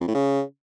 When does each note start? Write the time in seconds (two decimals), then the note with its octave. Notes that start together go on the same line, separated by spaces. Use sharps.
0.01 F2
0.08 A2
0.15 C#3